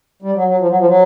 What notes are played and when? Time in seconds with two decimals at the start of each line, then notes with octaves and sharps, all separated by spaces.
0.22 G3
0.35 F#3
0.47 F#3
0.60 F3
0.69 F#3
0.79 F3
0.88 F#3